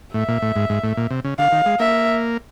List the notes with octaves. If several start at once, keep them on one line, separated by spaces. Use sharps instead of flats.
A2 E5
A#2
A2
G#2
G#2
A2
A#2
C3
C#3
D3 F5
D#3
G#3
A#3 E5